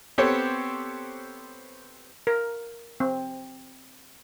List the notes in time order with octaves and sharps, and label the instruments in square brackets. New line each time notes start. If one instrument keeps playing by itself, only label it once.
[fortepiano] B3 C4 G4 A4 C5 C#5
[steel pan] A#4
C4